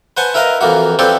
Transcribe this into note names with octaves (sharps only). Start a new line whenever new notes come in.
B4 C5 F#5 G#5 A5
E4 A#4 B4 D#5 F5
F2 E3 A#3 F#4
F3 C4 G4 A4 B4 D5